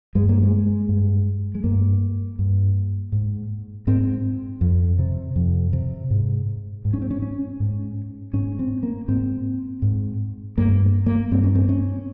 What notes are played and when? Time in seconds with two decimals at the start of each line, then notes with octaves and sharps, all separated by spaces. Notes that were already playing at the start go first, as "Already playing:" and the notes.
0.15 G2 G#3
0.29 A#3
0.42 G#3
0.89 G2
1.55 G#3
1.64 G2 A#3
2.39 G2
3.12 G#2
3.87 G#2 C4
4.61 F2
4.99 C3
5.36 F2
5.73 C3
6.11 G#2
6.85 G#2
6.93 C#4
7.02 C4
7.11 C#4
7.22 C#4
7.60 G#2
8.33 G#2 C#4
8.59 C4
8.83 A#3
9.08 G#2 C4
9.82 G#2
10.58 G2 A#3
11.06 A#3
11.31 G2 C4
11.43 C#4
11.55 C4
11.69 C#4